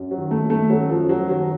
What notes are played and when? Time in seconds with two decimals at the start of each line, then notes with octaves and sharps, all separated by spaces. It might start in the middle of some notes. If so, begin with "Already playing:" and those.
Already playing: F#2
0.11 F#3
0.18 D#3
0.31 A3
0.44 D#3
0.50 A3
0.70 F#2 F#3
0.90 F3
0.97 F#2
1.09 F#3
1.23 D#3
1.29 F#3